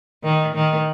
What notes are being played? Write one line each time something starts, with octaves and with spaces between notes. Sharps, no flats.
D#3
D#3